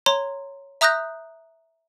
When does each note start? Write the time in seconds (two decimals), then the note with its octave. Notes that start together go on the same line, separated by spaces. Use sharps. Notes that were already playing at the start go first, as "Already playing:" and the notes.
0.06 C#5 A#5 C6
0.81 E5 A#5 D#6 F#6 G6 A#6